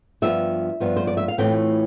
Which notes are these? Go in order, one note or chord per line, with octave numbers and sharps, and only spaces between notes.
G2 F3 B3 F4 E5
G2 F3 B3 F4
C5
D5
E5
F5
A2 E3 A3 C4 F4 G5